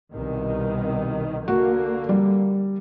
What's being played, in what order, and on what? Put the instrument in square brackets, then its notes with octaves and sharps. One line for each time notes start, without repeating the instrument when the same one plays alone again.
[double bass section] C2 B2 D#3
[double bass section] D3 A#3 [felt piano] F#4
[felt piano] G3